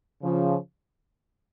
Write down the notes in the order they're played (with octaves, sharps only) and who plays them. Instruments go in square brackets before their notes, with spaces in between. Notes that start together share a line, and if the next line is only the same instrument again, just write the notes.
[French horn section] C#3 F3